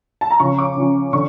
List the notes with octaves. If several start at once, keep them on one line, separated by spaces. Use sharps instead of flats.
A5
A#5
C#3 F3 C#4 C#6
D6
C#3 F3 C#4
D3 C#6